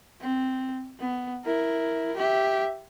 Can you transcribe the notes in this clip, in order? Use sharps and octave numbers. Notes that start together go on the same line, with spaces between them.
C4
B3
E4 A#4
G4 E5